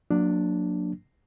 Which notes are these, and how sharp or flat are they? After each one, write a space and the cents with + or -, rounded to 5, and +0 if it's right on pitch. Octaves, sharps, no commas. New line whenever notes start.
F#3 -30 A#3 -5 D4 +0